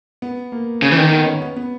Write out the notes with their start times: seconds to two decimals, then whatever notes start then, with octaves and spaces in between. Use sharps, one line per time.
0.22 B3
0.52 A#3
0.82 C#3
0.92 E3
0.98 D#3
1.11 B3
1.26 C#4
1.42 B3
1.56 B3